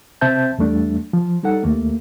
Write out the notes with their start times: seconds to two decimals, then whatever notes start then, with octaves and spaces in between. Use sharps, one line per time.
0.21 C3 C4 C5 E5 A5 G6
0.58 E2 G3 A3 D4
1.13 F3
1.43 G3 D#4 A4 F#5
1.63 D#2 A3 A#3